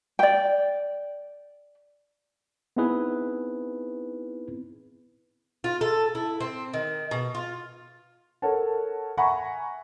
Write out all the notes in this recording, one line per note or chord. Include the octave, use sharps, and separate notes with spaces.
D5 G5
B3 C4 D#4 E4 G#4 B4
F4
A4
E4
C4
D#3
B2
F4
A4 A#4 C#5 F#5 A5
E5 F#5 G#5 A#5 B5 C#6